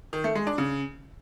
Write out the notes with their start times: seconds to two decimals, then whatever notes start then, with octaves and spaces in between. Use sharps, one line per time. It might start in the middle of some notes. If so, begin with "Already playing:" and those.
0.13 D#3
0.24 A3
0.35 G#3
0.47 D4
0.58 C#3